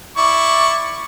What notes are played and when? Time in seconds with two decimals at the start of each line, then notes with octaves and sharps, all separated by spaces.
0.17 E4 D5 C#6